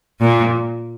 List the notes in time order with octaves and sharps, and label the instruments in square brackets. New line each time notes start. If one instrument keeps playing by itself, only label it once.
[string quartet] A#2